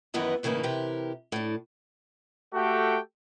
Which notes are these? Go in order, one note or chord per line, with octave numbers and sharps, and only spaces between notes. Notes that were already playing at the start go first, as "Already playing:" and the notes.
F#2 D#3 E3 B3 D#5 A#5
A2 C#3 E3 A#3 D#4
C3 E3 G4 A#4
A2 D4
A3 F#4 G4 A4 G5